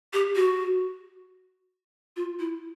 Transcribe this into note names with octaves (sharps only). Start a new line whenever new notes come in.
G4
F#4
F4
E4